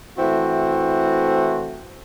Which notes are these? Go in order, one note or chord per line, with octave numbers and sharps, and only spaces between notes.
E3 A3 C4 E4 F#4